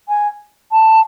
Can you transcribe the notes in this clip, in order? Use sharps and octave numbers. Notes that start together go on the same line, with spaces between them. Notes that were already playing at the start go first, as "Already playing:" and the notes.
G#5
A5